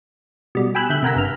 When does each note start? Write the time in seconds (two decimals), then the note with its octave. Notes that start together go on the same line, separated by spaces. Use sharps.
0.55 B2 G3
0.75 G5 G#5 B5 E6 F#6
0.90 D3 E5 F#6 G6
1.03 C3 A#4 F#5 G#5 A#5 B6
1.15 G1 F6